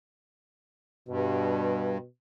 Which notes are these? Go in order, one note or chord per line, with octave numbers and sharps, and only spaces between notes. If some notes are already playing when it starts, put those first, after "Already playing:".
G2 B2